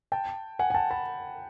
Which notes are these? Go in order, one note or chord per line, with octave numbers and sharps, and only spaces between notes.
G5 A5
F#5 G#5
G#5
G5 A5
A5 B5